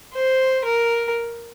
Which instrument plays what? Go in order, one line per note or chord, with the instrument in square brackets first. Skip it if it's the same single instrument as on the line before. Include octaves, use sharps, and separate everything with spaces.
[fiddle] C5
A#4